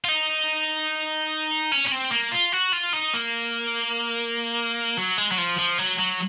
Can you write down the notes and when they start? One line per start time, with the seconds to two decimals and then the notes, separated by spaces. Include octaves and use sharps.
0.05 F4
0.09 D#4
1.72 C#4
1.87 C#4
1.92 C4
2.12 A#3
2.32 F4
2.53 F#4
2.73 F4
2.93 D#4
3.14 A#3
4.97 F#3
5.18 G#3
5.32 F#3
5.38 F3
5.58 F3
5.79 F#3
5.99 F#3